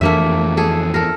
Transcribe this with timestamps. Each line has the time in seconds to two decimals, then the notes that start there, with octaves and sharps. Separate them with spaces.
0.01 F2 E3 A3 A#3 D4 E5
0.57 G#4 A4
0.94 A4 A#4